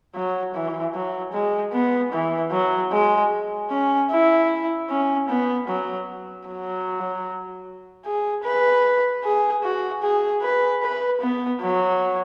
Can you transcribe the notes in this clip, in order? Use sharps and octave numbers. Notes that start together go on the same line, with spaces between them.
F#3
E3
F#3
G#3
B3
E3
F#3
G#3
C#4
E4
C#4
B3
F#3
F#3
G#4
B4
G#4
F#4
G#4
B4
B4
B3
F#3